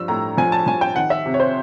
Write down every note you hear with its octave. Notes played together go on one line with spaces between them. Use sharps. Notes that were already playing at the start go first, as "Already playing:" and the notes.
Already playing: G2 F3 E6
A2 A#5
F3 G#5
A5
F3 G#5
G5
D#3 F#5
E5
C3
C#5
C5